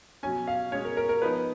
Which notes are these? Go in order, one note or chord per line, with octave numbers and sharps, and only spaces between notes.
B2 F#3 C#4 G#5
F5
B2 G#3 C#4 C#5
A#4
A#4
A#4
F3 B3 D#4 B4